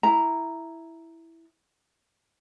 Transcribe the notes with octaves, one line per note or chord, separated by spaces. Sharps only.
E4 A#5